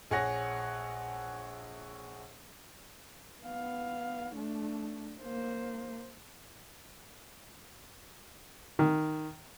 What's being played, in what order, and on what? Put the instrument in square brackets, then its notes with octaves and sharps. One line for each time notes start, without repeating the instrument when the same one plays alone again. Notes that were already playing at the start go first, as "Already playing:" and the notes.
[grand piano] A#1 G#4 C#5 F#5 A#6
[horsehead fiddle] B3 F5
A3 D4
A#3 C5
[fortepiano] D#3